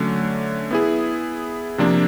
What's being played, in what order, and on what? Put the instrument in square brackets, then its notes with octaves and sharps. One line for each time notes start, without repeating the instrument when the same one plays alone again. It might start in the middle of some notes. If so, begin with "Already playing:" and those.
Already playing: [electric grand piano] D3 F#3 A3 C#4
B3 E4 G#4
C3 F3 A#3 D4